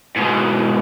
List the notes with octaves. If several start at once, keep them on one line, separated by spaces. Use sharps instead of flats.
G#2 B2